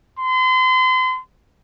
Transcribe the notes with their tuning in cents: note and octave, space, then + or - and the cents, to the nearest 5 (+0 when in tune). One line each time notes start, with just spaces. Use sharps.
C6 -35